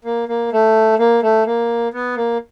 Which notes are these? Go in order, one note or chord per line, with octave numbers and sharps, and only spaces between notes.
A#3
A#3
A3
A#3
A3
A#3
B3
A#3